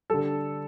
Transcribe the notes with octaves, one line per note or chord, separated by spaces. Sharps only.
D3 G3 A4